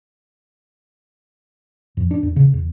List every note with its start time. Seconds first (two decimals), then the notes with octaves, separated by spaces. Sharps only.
1.97 F2
2.11 D4
2.23 E2
2.36 C#3
2.54 E2